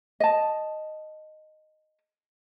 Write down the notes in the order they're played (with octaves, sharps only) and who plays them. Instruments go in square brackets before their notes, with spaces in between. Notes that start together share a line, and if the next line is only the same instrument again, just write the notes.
[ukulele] D#5 A5